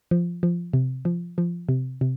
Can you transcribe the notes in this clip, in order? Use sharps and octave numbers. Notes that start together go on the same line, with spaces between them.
F3
F3
C3
F3
F3
C3
C3